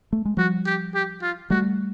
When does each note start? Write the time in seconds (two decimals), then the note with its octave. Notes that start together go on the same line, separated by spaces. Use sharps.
0.13 A3
0.25 G#3
0.37 F3 G3 F#4
0.66 G4
0.94 G4
1.22 F4
1.50 G3 A3 F#4